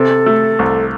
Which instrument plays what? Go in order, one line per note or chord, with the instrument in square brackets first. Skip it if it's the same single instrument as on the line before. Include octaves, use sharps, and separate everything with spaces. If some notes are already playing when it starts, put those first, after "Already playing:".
Already playing: [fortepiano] C3 [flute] A4
[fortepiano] A3
C2